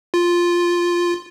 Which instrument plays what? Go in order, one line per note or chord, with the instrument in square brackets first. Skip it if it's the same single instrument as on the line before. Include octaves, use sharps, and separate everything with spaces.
[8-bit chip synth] F4